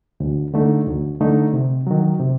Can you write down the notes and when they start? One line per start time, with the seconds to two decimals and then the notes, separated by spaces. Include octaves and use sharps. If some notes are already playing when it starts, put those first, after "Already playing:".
0.20 D2
0.54 D3 A3 D#4
0.87 D2
1.20 D3 A3 D#4
1.53 C3
1.87 D#3 F#3
2.20 C3